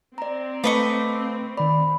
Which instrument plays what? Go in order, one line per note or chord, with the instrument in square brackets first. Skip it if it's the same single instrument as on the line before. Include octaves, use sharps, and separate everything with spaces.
[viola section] C4 [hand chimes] D5 A#5
[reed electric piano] A3 [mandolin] B4 D#5 C#6 [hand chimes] F5 A5 D6
[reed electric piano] D#3 D5 [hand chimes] B5